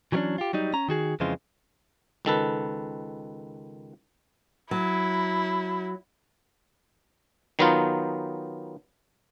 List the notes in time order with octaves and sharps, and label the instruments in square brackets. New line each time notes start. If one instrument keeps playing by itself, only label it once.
[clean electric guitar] E3 F#3 G3 A#3 C#4 D4
F4 G4
F#3 G3 D#4
C#4 A#5
D#3 F#4 G#4
F2 C#3 E3 F3 G#3 F4
[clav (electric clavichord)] C#2 D#3 A4 B4
[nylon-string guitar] F#3 [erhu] E4
[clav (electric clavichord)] D#3 F#3 B3 D#4 F4